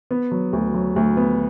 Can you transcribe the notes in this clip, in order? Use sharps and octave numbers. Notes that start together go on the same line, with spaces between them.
B3
F#3
D2
F#3
D2
B3